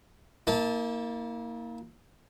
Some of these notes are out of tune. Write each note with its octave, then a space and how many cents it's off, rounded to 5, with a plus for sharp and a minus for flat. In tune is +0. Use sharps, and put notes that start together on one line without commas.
A#3 -5 E4 -45 A5 +0